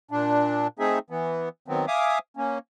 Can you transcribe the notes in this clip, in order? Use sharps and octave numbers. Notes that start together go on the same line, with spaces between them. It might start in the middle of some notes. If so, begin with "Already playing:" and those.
A#2 D4
A3 C4 D#4 G#4 E5
E3 B3
D#3 F#3 B3 C4
E5 F5 G#5 D6 D#6
A#3 C#4